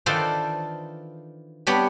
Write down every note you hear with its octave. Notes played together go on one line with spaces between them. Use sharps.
D#3 E3 D4 F4 A4 C5
G3 B3 D4 G4 C#5